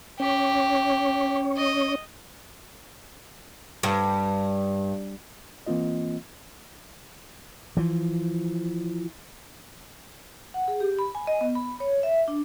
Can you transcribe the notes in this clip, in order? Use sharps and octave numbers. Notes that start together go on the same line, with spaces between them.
C#4 G4 C#5
D#5
G2
E3 A#3 C4 F4 D#5
E3 F3
F#5
G#4
G4
B5
G#5
D#5
B3
B5
C#5
E5
D4